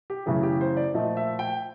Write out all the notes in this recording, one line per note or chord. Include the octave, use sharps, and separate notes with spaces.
G4
F#2 C#3 E3 A3 G#4
G4
C5
D5
A#2 F3 A3 D#5
E5
G5